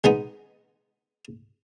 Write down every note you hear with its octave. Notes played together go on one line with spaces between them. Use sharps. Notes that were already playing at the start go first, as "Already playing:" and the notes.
G#3 B3 D#4